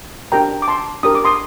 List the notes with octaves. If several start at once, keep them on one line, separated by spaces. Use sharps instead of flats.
D4 G4 A#4 G5 A#5
D6
A5 C6
D4 G4 A#4 D#6
D6
C6 D#6